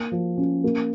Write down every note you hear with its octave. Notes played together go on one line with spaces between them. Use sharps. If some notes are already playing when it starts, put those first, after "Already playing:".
Already playing: A#3
F3
C#4
A#3